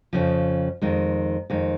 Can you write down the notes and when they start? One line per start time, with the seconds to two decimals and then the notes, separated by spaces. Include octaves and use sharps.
0.13 F2 C#3 F3
0.82 F2 D#3 G#3
1.50 F2 D#3 G#3